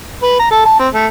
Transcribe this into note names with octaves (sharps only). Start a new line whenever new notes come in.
B4
A#5
A4
A5
C4
A3